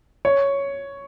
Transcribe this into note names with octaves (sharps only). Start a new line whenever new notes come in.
C#5